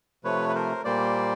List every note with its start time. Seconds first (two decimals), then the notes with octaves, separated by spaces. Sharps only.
0.24 C3 F3 A3 B4 C#5
0.49 B4
0.55 A#4 C5
0.85 A#2 G3 A#3 C5 D5